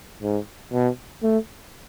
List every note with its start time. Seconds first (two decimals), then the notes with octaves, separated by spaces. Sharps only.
0.23 G#2
0.73 B2
1.23 A3